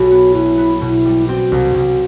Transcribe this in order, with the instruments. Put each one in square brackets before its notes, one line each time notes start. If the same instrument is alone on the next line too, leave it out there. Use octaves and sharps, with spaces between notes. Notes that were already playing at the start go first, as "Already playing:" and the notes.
Already playing: [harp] B1 [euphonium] F#4
[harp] B3
[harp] B2 [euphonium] E4
[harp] B3
[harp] B2 [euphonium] E4
[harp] G3
[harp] C4 [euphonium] F#4
[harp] C2
C2